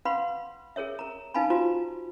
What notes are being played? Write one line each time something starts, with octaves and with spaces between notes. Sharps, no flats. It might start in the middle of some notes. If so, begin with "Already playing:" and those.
B4 F5 F#5 B5 C6
G#4 A#4 C#5 E5
A#4 A#5
D#4 B4 F5 G#5 A5 B5
F4 F#4 C5 A#5